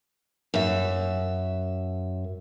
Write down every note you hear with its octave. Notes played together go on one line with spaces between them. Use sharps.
F#2 E5